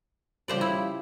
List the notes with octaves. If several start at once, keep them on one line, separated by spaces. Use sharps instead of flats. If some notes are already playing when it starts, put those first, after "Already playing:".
C#3 F3 G3 G4 C5 D5
E4